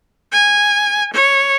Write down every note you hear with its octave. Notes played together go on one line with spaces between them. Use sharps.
G#5
C#5